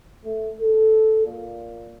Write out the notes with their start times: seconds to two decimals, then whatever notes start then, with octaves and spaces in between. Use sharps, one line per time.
0.25 A3
0.60 A4
1.26 A#2